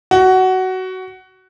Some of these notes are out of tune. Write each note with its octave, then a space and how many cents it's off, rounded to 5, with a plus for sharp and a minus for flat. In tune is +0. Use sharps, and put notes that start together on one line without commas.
F#4 +15